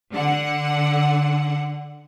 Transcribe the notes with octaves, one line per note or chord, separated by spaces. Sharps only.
D3 F#5